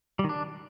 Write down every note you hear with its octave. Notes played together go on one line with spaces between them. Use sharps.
G3
D#3
D4